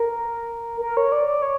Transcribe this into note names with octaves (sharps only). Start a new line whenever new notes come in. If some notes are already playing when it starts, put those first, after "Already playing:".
Already playing: A#4
A#4
C#5
D5
D5
C#5